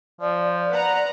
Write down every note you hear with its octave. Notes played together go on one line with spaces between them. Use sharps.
F3 D5
B4 F#5 A#5